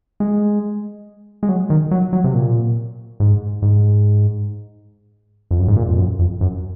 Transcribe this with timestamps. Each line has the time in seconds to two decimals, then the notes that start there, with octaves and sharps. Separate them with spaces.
0.20 G#3
1.43 G#3
1.49 F#3
1.70 D#3
1.91 F#3
2.13 F#3
2.24 C3
2.34 A#2
3.20 G#2
3.62 G#2
5.51 F2
5.59 F#2
5.68 G#2
5.77 A#2
5.88 F2
5.98 F#2
6.19 F2
6.41 F#2